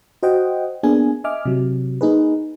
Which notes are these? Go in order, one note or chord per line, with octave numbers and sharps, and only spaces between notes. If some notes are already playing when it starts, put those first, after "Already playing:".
F#4 C5 D#5 F#5 G5
A#3 B3 D4 G#4 G#5
D#5 E5 G#5 D6 F6
C3 F#3
A#3 D#4 G#4 B4